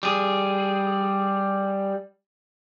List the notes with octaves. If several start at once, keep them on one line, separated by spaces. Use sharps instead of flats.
G3 G#4